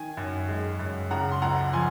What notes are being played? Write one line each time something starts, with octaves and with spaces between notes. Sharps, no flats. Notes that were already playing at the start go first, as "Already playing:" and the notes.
Already playing: D#3 G#5
F#2
G#3
F#2
C#3 F#5 A#5
C6
C#2 F#5 A#5
F3 G#5 C6